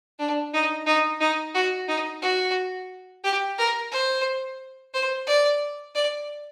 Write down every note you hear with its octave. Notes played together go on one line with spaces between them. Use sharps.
D4
D#4
D#4
D#4
F#4
D#4
F#4
G4
A#4
C5
C5
D5
D5